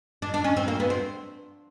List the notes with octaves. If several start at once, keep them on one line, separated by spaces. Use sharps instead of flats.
D4
D4
C#4
C4
A#3
B3
C4